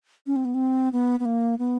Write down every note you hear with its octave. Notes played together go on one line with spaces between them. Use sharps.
C#4
C4
B3
C4
B3
B3
A#3
B3